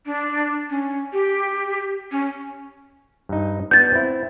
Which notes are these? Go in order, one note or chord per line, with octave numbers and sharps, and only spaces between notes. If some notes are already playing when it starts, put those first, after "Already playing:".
D4
C#4
G4
C#4
G2 D#4
B3 D4 G6 A6
C4 E4